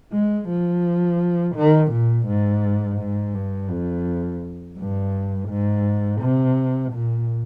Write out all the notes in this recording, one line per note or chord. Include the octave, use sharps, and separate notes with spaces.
G#3
F3
D#3
A#2
G#2
G#2
G2
F2
G2
G#2
C3
A#2